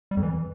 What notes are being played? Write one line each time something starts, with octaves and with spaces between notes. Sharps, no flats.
G3
F2
E3